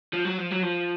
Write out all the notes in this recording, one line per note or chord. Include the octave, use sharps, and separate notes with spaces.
F3
F#3
F3
F#3
F3